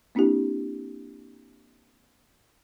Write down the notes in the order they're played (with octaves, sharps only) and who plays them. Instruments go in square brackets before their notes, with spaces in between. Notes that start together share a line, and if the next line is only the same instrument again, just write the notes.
[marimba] A#3 C4 D4 E4 G4